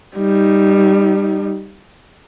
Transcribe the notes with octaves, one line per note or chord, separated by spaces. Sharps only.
G3 D#4